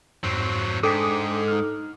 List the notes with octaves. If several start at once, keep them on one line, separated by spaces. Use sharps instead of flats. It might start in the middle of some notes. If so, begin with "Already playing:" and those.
F2 G#2 F#3 C4
G#2 D4 A4 G5 D6 D#6 B6
D#4 F6